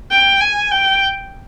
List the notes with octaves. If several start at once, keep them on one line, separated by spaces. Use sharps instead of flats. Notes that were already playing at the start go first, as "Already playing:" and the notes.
G5
G#5
G5